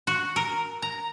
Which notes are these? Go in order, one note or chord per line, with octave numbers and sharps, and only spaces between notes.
F#4
A#4
A#5